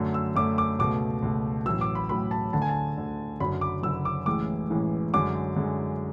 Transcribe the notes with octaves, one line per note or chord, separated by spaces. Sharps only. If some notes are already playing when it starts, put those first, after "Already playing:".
Already playing: F#2 D3 A3
E6
F#2 D3 A3 D6
D6
C#2 B2 A3 D6
C#2 B2 A3
A1 A2 F#3 E6
D6
B5
A1 A2 F#3 B5
A5
D2 D3 A3 A5
G#5
A5
D2 D3 A3
F#1 F#2 D3 F#3 B5
D6
F#1 F#2 D3 F#3 E6
D6
A1 A2 E3 G#3 D6
A1 A2 E3 G#3
F#2 D3 G#3 D6
F#2 D3 G#3